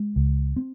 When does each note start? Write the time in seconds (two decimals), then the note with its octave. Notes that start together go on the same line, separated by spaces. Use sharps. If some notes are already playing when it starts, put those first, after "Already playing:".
Already playing: G#3
0.16 C#2
0.56 C4